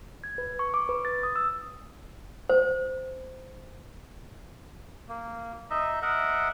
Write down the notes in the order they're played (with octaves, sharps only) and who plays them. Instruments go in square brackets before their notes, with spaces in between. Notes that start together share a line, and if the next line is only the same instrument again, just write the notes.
[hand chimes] G#6
B4
C#6
D6
B4
A6
D#6
E6
[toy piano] C5
[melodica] A#3
D#4 D#5 E5
A#4 D#5 E5 F#5